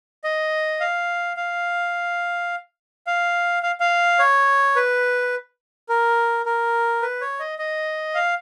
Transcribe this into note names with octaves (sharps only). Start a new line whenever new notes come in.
D#5
F5
F5
F5
F5
F5
C#5
B4
A#4
A#4
B4
C#5
D#5
D#5
F5